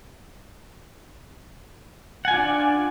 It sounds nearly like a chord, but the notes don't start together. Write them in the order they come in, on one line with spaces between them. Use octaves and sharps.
F#5 G#5 F4 D4 D5